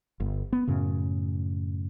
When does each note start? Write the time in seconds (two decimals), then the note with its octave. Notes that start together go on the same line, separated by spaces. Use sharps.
0.20 G1
0.53 B3
0.67 F#2 A2 C#3